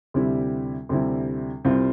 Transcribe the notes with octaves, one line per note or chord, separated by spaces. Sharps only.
D2 C3 G3 C4 E4
D2 C3 G3 C4 E4
C2 C3 G3 C4 F4